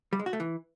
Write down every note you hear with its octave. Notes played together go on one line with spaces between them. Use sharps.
G3
G#3
F#4
A3
E3